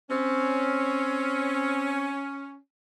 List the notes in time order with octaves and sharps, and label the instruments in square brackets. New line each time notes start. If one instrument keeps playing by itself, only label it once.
[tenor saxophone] C4 [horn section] C#4